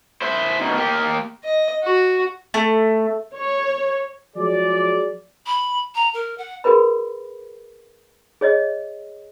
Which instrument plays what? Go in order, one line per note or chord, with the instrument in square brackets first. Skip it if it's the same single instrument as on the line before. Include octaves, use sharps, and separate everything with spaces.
[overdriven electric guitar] E4 C5
B2 D#3
A#3 G4
[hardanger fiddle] D#5
F#4
[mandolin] A3
[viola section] C#5
[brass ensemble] F3 F#3 G#3 G#4 D5
[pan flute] B5
A#5
A#4
F#5
[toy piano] F#4 G#4 A#4 B4 B5
G#4 C#5 D#5